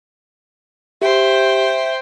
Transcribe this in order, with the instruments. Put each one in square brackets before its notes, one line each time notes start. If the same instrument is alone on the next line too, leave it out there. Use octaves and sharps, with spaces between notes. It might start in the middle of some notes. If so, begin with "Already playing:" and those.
[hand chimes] G4 [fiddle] C5 G5 [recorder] E5